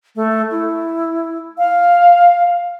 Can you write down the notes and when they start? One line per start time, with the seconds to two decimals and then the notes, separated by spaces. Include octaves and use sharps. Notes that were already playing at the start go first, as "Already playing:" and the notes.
0.16 A3
0.51 E4
1.58 F5